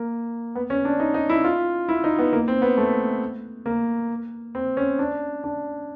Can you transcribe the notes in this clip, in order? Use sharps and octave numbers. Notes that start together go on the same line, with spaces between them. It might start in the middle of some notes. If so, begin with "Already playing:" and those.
Already playing: A#3
B3
C#4
D4
D#4
D#4
E4
F4
E4
D#4
B3
A#3
C4
B3
A3
A#3
C4
C#4
D4
D4